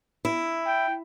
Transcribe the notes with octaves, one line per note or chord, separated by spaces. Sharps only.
E4
G5